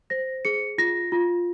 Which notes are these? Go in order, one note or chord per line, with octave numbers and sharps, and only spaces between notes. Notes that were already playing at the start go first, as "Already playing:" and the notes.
C5 A#6
G#4 C#7
F4 A#6
F4